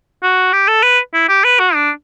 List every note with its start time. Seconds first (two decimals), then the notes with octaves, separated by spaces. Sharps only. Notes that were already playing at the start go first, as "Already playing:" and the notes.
0.23 F#4
0.53 G4
0.68 A4
0.83 B4
1.13 E4
1.29 G4
1.44 B4
1.59 F#4
1.74 D4